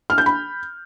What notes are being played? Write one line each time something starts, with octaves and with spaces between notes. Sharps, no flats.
F6
G6
B5